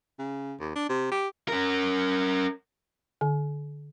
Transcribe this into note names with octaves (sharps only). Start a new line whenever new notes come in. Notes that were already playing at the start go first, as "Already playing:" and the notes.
C#3
D#2
D4
C3
G4
C#4 A#4
D3